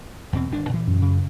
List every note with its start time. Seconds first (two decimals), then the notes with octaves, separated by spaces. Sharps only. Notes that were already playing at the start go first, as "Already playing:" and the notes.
0.33 E2 B2 C4
0.51 G1 D#3 D4
0.69 A#2 E3
0.87 F#2
1.02 C#3